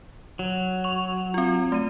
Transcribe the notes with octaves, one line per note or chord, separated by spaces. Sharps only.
F#3
C#6 F7
C4 F4
A3 D#7